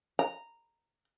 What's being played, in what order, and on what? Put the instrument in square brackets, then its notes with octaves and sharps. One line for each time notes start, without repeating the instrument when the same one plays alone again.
[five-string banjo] A#5